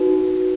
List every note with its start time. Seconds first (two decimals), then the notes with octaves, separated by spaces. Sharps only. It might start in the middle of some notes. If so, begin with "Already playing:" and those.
Already playing: D#4 F#4 B4